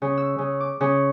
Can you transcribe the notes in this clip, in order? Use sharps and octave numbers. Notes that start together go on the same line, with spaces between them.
C#3
E6
C#3
D6
C#3